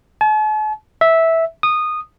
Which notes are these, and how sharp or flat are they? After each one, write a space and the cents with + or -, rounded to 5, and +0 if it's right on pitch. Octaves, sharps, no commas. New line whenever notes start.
A5 -45
E5 -10
D#6 -15